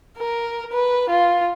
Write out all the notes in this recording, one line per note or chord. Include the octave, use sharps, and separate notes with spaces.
A#4
B4
F4